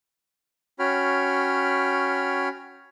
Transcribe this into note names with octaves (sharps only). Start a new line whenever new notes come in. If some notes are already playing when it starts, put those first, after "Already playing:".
C#4 F#4 C#5 G5 B5 F6